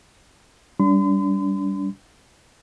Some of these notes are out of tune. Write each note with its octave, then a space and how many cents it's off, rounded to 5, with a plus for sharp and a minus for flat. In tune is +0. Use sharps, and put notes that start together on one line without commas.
G3 +0 D4 -40 C6 -45